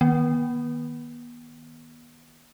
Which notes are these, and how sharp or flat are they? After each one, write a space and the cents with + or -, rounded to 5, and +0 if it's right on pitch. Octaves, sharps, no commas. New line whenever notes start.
D#3 +0 B3 -40